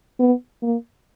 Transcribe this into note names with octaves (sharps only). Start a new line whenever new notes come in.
B3
A#3